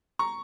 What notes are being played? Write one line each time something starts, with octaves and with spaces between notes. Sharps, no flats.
A#5 C#6